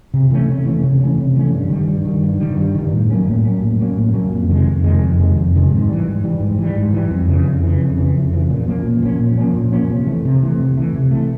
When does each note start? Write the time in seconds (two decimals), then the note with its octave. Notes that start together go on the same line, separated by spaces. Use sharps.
0.14 C3
0.31 E3 A3 C#4
0.49 C3
0.65 E3 A3 C#4
0.83 C3
1.00 E3 A3 C#4
1.18 C3
1.36 E3 A3 C#4
1.53 G2
1.70 D#3 G3
1.88 G2
2.05 D#3 G3
2.23 G2
2.40 D#3 G3
2.57 G2
2.75 D#3 G3
2.93 A2
3.10 F#3 A#3 C#4
3.27 A2
3.44 F#3 A#3 C#4
3.62 A2
3.79 F#3 A#3 C#4
3.97 A2
4.14 F#3 A#3 C#4
4.32 F2
4.50 C3 D#3 G#3
4.67 F2
4.84 C3 D#3 G#3
5.02 F2
5.19 C3 D#3 G#3
5.37 F2
5.53 C3 D#3 G#3
5.71 G#2
5.89 E3 G3
6.06 G#2
6.24 E3 G3
6.40 G#2
6.59 E3 G3
6.75 G#2
6.93 E3 G3
7.11 F2
7.28 C#3 E3
7.46 F2
7.63 C#3 E3
7.81 F2
7.98 C#3 E3
8.16 F2
8.33 C#3 E3
8.50 A#2
8.68 F3 A#3 C#4
8.85 A#2
9.02 F3 A#3 C#4
9.20 A#2
9.38 F3 A#3 C#4
9.55 A#2
9.72 F3 A#3 C#4
9.90 C3
10.07 E3 A3
10.25 C3
10.43 E3 A3
10.60 C3
10.77 E3 A3
10.94 C3
11.11 E3 A3